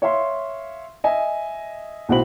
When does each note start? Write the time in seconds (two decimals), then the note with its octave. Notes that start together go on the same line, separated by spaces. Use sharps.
0.02 C#5 E5 F5 C6
1.04 D#5 E5 G#5
2.09 B1 A2 F#4 C5 B5 F#7